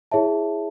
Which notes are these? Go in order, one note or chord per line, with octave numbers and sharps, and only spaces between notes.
E4 G#4 C#5 E5 A5